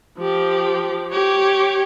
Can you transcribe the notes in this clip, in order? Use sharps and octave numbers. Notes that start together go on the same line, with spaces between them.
F3 G4
G4 C#5